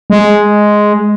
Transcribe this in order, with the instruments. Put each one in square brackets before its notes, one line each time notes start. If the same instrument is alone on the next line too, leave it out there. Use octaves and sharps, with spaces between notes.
[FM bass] G#3